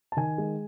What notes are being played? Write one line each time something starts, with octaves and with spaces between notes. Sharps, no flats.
A5
D#3 G#5
G#3